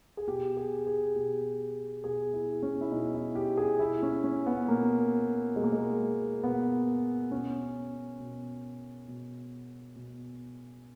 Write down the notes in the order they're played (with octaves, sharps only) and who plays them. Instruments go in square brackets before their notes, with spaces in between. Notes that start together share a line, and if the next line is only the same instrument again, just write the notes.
[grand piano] G#4
B2 G4
G#4
G#4
B2 G4
B2 G#4
E4
C#4
E4
B2 D#4
E4
G4
G#4
B2 E4
C#4
C#4
B3
B2 A#3
B2 G#3
A#3
G#3
B2 B3
B2 C#4
B2
B2
B2